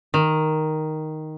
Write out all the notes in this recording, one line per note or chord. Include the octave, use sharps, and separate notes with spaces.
D#3